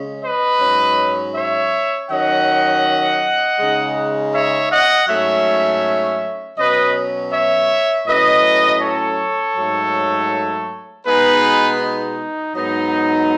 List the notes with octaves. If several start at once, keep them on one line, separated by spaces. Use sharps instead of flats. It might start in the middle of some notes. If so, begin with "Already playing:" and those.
Already playing: C#3 G#3 C#4
B4 D#5
G#2 F#3 C#4
C#5 E5
D#3 F#3 C#4 D#5 F#5
C#3 G#3 D#4
C#5 E5
D#5 F#5
G#2 F#3 A3 C#4 C#5 E5
B2 F#3 C#4 B4 D#5
C#5 E5
A2 F#3 C#4 B4 D#5
A4 C#5
G#2 F#3 A3
B2 G#3 B3 D#4 G#4 B4
D#4
G#2 F#3 B3 D#4